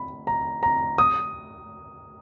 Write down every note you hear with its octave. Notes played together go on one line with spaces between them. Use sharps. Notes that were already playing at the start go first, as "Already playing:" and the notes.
Already playing: B5
A#5
A#5
D#6